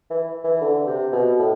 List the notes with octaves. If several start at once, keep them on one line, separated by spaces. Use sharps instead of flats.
E3
E3
D3
C3
B2
A2